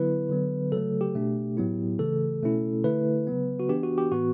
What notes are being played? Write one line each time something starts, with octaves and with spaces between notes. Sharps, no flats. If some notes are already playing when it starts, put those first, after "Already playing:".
Already playing: D3 F#3 B3 E4 B4
D3 F#3 B3
C#3 F#3 A3 A4
G4
B2 A3 D4
A2 F#3 B3 E4
C#3 E3 A3 A4
B2 A3 C#4 E4
D3 A3 E4 B4
C#3 F#3 B3
F#4
E3 B3 D4 G4
F#4
G4
A2 E3 B3 F#4